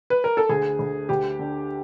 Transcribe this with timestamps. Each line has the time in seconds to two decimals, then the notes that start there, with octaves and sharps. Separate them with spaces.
0.10 B4
0.24 A#4
0.37 A4
0.49 D2 G#4
0.79 D2
1.09 D2 G4
1.39 D3